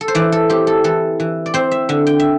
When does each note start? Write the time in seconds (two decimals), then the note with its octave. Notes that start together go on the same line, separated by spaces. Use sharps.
0.01 A4
0.08 C5
0.15 E3 D5
0.32 A4
0.50 C4 G4
0.67 A4
0.84 E3 A4
1.20 E3
1.46 D5
1.54 C4 C5
1.71 E5
1.89 D3 E5
2.07 G5
2.19 E5